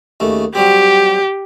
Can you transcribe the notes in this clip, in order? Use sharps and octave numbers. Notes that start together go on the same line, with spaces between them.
D#2 C#3 A3
F#3 G3 C4 G4